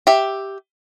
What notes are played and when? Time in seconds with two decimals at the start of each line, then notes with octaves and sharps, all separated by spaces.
0.07 G4 E5